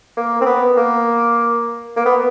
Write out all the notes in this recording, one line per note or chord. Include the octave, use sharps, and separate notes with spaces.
A#3
C4
B3
A#3
A#3
B3